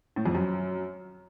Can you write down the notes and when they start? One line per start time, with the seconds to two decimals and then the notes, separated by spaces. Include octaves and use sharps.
0.16 A2
0.26 F2
0.35 F#2